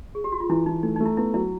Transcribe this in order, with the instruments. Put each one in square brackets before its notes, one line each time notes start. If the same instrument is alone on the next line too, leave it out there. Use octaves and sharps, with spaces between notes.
[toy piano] G#4
G4
F#4
F4
[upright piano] E3 [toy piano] E4
[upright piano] E3 [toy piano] D#4
[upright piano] A3 [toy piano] D#4
[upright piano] A3 [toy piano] D#4
[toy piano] E4
[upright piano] B3 [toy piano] E4
[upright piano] F#3 [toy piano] E4